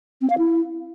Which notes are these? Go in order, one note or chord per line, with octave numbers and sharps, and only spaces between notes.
C4
F5
E4